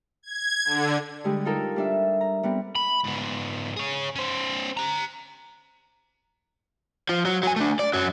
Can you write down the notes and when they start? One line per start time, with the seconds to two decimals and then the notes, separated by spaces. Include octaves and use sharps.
0.23 G#6
0.65 D3
1.24 D3 G3 G#3 G4
1.45 D#4 F4 A4 A#4
1.76 G3 D4 E5
2.21 A#5
2.43 G3 B3 C4
2.76 B5
3.04 G#2 B3
3.77 G#4 C#5
4.16 C#4 C5
4.77 G4 A#5
7.09 F3
7.25 F#3
7.43 F#3 G#5
7.56 A3 D4
7.79 D5
7.94 F#2 F#3